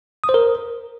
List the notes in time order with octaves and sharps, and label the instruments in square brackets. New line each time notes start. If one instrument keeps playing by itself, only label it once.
[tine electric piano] D#6
C5
A#4